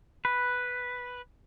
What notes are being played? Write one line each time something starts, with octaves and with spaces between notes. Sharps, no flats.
B4